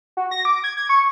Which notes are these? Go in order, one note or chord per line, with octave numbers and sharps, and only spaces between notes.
F#4
A#6
D6
G#6
G#6
C#6